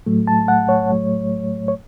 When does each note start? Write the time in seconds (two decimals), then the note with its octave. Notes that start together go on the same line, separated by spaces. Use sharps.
0.06 A2 F#3 A3
0.27 A5
0.48 F#5
0.69 C#5
0.90 A2 F#3 A3
1.68 C#5